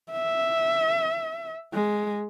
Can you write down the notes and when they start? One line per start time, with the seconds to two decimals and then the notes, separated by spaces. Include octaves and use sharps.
0.12 E5
1.74 G#3